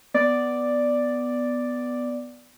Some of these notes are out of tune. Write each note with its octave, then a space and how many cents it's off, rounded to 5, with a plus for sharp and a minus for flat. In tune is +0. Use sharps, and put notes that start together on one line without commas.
B3 +5 D5 +0